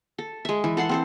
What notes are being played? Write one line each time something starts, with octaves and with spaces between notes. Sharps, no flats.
A4
G#3 E5
E3
A4 F#5 C6
C4 A4 C5